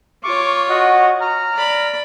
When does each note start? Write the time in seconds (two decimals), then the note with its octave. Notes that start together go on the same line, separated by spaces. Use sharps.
0.24 F4 C#5 C#6 D6
0.69 F#4 D#5 F#5
1.21 A#5 F6
1.53 D5 B5